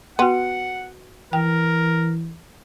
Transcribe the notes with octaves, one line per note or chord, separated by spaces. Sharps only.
B3 F#4 F#5 G5 C6
E3 A#4 G5